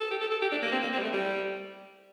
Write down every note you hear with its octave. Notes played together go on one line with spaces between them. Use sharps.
A4
G4
A4
A4
G4
D4
A#3
C4
A#3
C4
G3
A3
G3